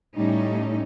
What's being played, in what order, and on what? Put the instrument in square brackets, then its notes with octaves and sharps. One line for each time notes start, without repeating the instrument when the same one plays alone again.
[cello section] A2 G3 A3 C#4 D#4